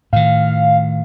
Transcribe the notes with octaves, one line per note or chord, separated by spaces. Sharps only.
A2 D#3 F5